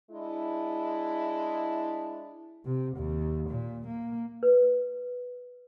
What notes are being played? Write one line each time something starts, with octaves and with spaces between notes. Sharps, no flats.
G#3 D4 E4
C3
D#2
A#2
A#3
B4